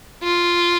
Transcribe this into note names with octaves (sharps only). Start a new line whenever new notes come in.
F4